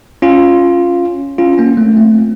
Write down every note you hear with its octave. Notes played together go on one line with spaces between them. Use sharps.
C#4 F4
C#4 F4
A#3 C#4
A3 C4
A3 C4